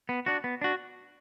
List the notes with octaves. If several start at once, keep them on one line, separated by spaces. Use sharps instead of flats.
B3
D4 F#4
B3
D4 F#4